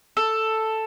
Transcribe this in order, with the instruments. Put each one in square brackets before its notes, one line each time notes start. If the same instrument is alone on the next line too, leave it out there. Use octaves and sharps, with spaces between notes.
[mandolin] A4